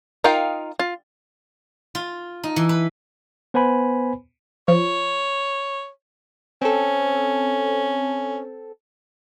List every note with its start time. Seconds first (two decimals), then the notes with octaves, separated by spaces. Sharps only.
0.24 D#4 F4 A#4 F5 G5
0.79 F4
1.95 F4
2.44 D#4
2.56 E3
2.69 B4
3.54 B3 B4 C5 G#5 B5
4.68 F3 C#5
6.62 C4 C#4 A4